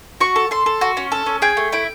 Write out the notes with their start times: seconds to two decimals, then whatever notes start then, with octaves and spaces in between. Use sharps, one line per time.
0.20 F#4 C#6
0.36 A4
0.51 A4 C6
0.66 A4
0.81 F#4
0.97 C#4
1.12 A4
1.26 C#4
1.42 G#4 G5
1.57 A3
1.72 E4 G5